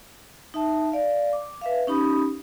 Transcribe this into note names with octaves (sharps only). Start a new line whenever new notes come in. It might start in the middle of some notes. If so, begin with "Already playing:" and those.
D#4 E5 A5
D5 F5
D6
B4 E5 F5
C#4 D#4 G4 B5 D#6